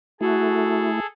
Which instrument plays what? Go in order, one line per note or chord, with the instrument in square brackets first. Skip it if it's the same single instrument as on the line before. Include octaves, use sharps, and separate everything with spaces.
[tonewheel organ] A3 E4 [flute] F#4 [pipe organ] G#4 A4